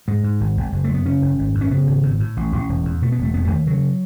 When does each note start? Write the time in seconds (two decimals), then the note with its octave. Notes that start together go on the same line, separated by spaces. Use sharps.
0.08 G#2 G#3
0.24 G#2
0.41 G#1
0.57 G#1
0.72 F#1
0.84 A3
0.89 F#2
0.94 B3
1.06 C#3 C#4
1.22 F#1
1.39 G#1
1.55 F#2
1.61 C#4
1.71 C#3 B3
1.87 G#1
2.03 A2
2.20 A2
2.37 A1
2.52 A1
2.69 E1
2.85 E2
3.02 B2 A3
3.12 B3
3.18 E1 A3
3.34 E1 B3
3.44 A3
3.51 D#2
3.66 C#3 F#3